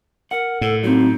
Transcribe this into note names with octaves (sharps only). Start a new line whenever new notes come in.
A#4 F#5
A2 A4
F#3 C4 D#4